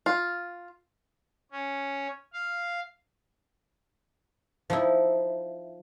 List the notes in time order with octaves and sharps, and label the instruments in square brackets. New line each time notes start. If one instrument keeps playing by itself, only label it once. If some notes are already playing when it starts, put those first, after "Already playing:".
[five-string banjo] F4
[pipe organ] C#4
F5
[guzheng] F3 D#4 E4